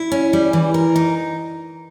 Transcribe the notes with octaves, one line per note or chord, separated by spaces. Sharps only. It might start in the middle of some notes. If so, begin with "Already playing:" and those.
Already playing: E4
C#4
G3
E3
A#4
D#4